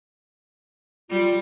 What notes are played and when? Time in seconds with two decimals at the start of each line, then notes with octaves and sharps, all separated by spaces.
1.10 G3 F4